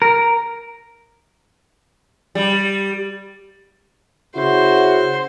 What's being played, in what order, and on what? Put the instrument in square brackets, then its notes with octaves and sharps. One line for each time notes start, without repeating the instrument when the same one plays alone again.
[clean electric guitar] A#4
[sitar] G3
[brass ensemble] C#3 E4 F#4 [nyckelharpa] C5